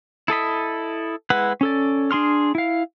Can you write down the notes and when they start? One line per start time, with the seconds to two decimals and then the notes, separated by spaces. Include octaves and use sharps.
0.28 E4 A4 D#5 B5
1.30 G#3 E4 B4 F#5
1.61 C#4 A4 D5
2.11 D4 G#4 C6 F6
2.55 E4 F5